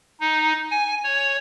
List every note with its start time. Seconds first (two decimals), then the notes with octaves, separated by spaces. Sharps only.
0.20 D#4
0.71 G#5
1.04 C#5